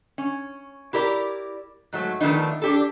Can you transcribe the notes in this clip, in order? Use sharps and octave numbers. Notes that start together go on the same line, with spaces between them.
C#4
E4 G4 A#4 D5
G#2 F#3 A3
D#3 F3 A3 B3 D4 D#4
D4 G4 A4